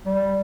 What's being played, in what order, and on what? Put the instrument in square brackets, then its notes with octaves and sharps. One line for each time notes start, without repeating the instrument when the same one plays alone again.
[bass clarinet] G3